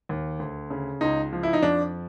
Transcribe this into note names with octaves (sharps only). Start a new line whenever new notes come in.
D#2
D2
C#3
C#2 D#4
F3
E4
D#4
F2 D4